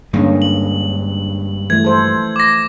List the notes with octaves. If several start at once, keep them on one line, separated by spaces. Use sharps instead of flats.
G2 D3 G#3 A#3 C#4
F#7
E3 F3 A3 G#6
A4 C5
D6 A#6